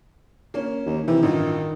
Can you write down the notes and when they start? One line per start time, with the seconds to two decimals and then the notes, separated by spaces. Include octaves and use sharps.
0.54 A#3 C#4
0.86 D#2
1.08 C3 D#3 E3
1.23 A1 G2 D#3 F4